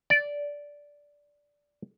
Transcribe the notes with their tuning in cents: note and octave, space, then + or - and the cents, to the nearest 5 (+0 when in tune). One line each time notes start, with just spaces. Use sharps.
D5 -10